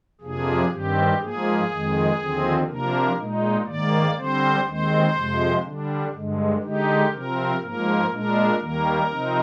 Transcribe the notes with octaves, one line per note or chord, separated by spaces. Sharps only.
F2 C3 F3 A#3 D4 G#4
G2 D#3 G3 C4 G4
G#2 F3 A#3 G#4
F2 D#3 G#3
D#2 D3 F3 C4
C3 F3 A#3 D4 A#4
A#2 G#3 D#4
G#2 D#3 A#3 D5
D3 G3 C4 C5
D#2 D#3 G#3 C4 C5
F2 C3 F3 G#3
D3 G3 D4
G2 D3 G#3
D3 G#3 D#4 G4
C3 F3 C4 A#4
G#2 F3 A#3 A#4
A#2 G#3 D4 A#4
D#2 D#3 G3 A#3 A#4
C3 F3 C4 D#4